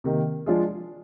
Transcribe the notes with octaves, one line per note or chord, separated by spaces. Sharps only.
C3 D#3 A#3
F3 G#3 D4 F4 G#4